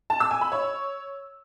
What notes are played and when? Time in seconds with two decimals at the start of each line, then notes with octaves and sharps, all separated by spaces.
0.10 A5
0.20 E6
0.31 G#5
0.41 B5
0.52 C#5